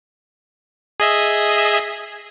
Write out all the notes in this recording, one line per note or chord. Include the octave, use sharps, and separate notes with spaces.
G#4 D#5 E5